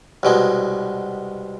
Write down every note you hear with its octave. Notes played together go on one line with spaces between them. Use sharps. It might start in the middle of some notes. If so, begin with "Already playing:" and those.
C2 B2 G#3